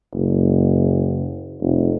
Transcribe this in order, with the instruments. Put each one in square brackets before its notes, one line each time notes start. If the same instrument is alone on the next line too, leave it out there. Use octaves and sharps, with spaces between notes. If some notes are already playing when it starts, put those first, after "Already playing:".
[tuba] F#1
F1